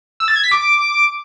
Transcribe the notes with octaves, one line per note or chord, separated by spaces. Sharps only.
E6
A6
G#6
B6
D6